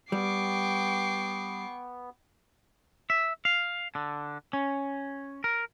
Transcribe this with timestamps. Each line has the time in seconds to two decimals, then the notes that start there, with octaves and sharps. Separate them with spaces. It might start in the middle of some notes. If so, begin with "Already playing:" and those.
0.12 G3 B3 G5 C#6 D6 C7
3.10 E5
3.45 F5
3.95 D3
4.53 C#4
5.44 A#4